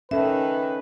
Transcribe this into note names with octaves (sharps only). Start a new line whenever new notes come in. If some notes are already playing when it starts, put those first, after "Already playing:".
D#3 C#4 A4 B4 E5